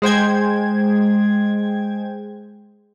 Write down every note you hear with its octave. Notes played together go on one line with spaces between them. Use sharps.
G#3 C5 G5 G#6